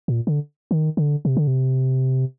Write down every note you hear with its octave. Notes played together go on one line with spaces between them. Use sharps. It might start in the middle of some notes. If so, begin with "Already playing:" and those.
A#2
D3
D#3
D3
C3
D3
C3